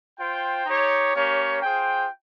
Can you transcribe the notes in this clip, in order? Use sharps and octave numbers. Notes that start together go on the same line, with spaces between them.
F4 C5 G5
D#4 G4 C#5
A#3 C#4 G4 C#5
F4 G#4 C5 G5